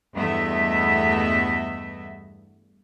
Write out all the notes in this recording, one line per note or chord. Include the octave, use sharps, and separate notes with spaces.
E2 G2 A3 B3 D#5 E5